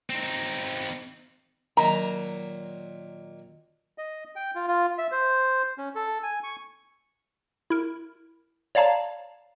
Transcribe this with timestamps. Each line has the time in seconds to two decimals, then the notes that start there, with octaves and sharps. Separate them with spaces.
0.10 C4 D#4
1.77 A#2 D#3 F#3 A#5
3.98 D#5
4.36 G5
4.55 F4
4.68 F4
4.98 E5
5.11 C5
5.78 C#4
5.95 A4
6.23 G#5
6.43 C#6
7.70 E4 A#4
8.75 C#5 D5 F5 A5 A#5